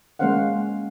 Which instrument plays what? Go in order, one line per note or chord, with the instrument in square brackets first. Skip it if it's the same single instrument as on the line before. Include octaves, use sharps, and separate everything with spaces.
[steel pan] G#3 A#3 C#4 C5 F5 F#5